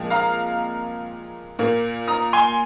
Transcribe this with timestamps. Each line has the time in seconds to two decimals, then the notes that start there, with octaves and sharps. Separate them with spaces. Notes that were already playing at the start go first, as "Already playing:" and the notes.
Already playing: A#2 F3 G#3 C4
0.10 F5 A#5
1.59 A#2 A#3
2.08 A#5 D#6
2.33 G#5 C6